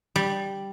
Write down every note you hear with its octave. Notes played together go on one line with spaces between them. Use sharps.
G3